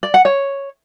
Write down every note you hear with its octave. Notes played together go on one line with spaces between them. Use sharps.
D5
F#5
C#5